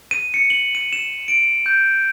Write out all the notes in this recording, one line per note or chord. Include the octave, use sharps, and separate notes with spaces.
D#7
C#7
F#7
D#7
E7
D7
G6